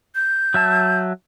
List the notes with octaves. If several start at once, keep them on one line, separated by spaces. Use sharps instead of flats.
G6
F#3 E5 A5